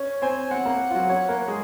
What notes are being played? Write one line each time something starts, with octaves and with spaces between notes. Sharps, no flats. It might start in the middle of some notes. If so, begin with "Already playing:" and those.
Already playing: C#4 C#5
C4 C5 G#5
C4 C5 F#5
A#3 A#4
F4
F#3 F#4
C#4 C#5
A#3 A#4
G#3 G#4